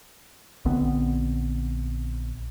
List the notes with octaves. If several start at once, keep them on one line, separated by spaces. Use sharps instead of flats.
A#1 D3 B3 C4